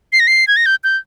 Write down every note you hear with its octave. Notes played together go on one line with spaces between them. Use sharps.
C7
A#6
C7
G#6
A#6
G6
G6